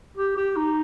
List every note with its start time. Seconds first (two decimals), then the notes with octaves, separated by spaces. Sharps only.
0.17 G4
0.37 G4
0.56 D#4